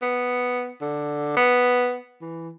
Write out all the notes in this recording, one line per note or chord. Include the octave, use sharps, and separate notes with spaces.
B3
D3
B3
E3